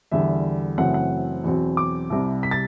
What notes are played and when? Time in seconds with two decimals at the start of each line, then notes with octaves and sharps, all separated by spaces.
0.12 E2 D3 G3 E5
0.78 F#1 F#2 E3 A3 C4 F#5
0.94 F#5
1.44 E2 B2 F#3 C4
1.77 D6
2.10 C2 C3 G3
2.43 B6
2.51 A6